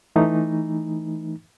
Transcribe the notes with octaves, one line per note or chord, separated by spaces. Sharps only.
E3 A3 D#4